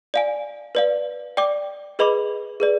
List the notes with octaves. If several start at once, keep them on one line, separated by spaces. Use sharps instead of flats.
D5 F5 G#5
B4 D5 F5
D5 G5 D6
G#4 B4 D#5 B5 D6
G#4 B4 D5